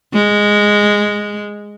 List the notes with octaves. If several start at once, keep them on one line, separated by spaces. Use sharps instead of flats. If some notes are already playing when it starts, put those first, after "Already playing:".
G#3